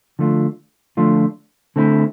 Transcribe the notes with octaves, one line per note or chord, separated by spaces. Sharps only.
D3 F3 A3 D4 F4
D3 F3 A3 D4 F4
D3 A3 C4 E4